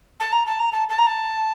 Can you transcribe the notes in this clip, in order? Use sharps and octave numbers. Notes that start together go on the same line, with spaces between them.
A5
A#5
A5
A#5
A5
A5
A#5
A5